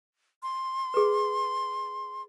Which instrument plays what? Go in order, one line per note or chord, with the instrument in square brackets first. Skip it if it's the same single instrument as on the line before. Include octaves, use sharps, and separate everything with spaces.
[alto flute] C6
[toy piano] G#4 B4